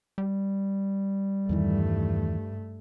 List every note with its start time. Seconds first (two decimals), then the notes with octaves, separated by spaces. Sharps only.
0.18 G3
1.49 E2 G2 D#3 E3 A3